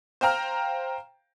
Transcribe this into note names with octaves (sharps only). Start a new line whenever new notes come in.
C5 F5 G5 A#5 F6